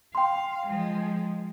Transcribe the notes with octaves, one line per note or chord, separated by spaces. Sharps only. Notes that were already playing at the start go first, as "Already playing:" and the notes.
F5 G5 C6
F3 G#3